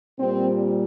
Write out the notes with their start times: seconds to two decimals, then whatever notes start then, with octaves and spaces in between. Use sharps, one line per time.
0.19 A#2 G3 C4